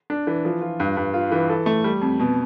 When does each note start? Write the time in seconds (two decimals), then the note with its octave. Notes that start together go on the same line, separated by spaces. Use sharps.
0.10 D4
0.27 E3
0.45 F3
0.61 F4
0.80 G2
0.97 G2
1.14 F4
1.32 E3
1.50 A4
1.66 A3
1.84 G3
2.01 F2
2.20 B2